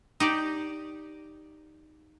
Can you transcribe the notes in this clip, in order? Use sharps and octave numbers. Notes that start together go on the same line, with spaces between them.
D#4 G4 D5